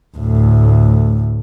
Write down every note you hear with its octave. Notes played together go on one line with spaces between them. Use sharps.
D2 A2